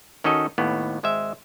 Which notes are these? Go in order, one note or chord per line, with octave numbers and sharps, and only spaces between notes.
D#3 C#4 D#4 F#4 A4 D#5
D#2 A2 B3
G#1 G#3 C5 E5